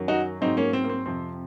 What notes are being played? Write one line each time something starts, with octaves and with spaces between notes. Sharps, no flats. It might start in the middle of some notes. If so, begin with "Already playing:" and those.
Already playing: F#2 D#3 F#3
D#4 F#4
G#2 F#3 C4 D#4
A#3 C#4
C4
A#3
C4
F2 C3 F3 C4